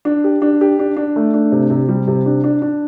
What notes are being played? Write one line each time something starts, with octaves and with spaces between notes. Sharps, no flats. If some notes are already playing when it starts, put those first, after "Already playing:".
D4
G4
D4
G4
D4
D4
A3
D4
C3
C3
G3
C3
D4
D4
D4